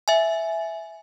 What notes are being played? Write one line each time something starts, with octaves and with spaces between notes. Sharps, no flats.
E5 G#5